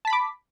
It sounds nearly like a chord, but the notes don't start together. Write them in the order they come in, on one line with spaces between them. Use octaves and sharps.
A5 B6 B5 D6